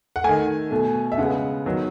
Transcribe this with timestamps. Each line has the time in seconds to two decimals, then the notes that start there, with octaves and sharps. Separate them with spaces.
0.16 F#5
0.24 D#3 A3 G#5
0.71 B2 A3
1.12 E5
1.18 C#3 G#3 B3 F#5
1.65 D#3 F#3 B3